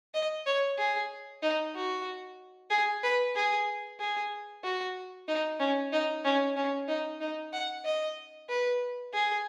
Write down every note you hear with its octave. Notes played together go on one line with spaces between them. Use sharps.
D#5
C#5
G#4
D#4
F#4
G#4
B4
G#4
G#4
F#4
D#4
C#4
D#4
C#4
C#4
D#4
D#4
F#5
D#5
B4
G#4